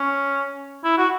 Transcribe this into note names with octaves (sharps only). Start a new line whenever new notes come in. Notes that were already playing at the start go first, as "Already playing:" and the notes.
Already playing: C#4
E4
F#4